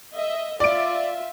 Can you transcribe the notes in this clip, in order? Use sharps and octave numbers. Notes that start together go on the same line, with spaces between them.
D#5 E5
F4 D5 E5 D7